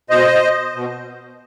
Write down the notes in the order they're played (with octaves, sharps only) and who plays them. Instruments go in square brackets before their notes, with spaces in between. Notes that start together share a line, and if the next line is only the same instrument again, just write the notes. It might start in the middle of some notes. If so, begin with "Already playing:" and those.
[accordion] B2 C5 D#5
B2